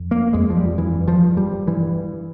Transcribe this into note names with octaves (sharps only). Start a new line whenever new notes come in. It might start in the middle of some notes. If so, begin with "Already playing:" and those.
Already playing: F2
A#3
F2 G#3
F3
G3
G2 E3
F3
G2
G3
G2 E3